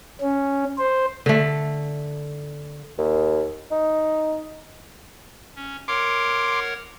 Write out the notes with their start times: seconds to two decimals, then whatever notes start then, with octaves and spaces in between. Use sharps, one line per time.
0.21 C#4
0.79 C5
1.26 D3 A3
2.98 D#2
3.71 D#4
5.56 C#4
5.88 A#4 C#5 F#5 C6 D6